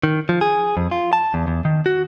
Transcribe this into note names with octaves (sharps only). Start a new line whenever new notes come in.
D#3
F3
G#4
F2
F4
A5
E2
E2
D#3
F#4